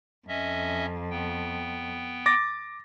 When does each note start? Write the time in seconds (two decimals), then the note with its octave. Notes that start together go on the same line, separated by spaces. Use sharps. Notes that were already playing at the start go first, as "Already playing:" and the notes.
0.28 F2 C#4 D#5 E5
1.10 B3 G5
2.26 D6 A6 A#6